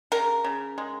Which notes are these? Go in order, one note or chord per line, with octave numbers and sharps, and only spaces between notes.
C#3 A#4
C#3
G#3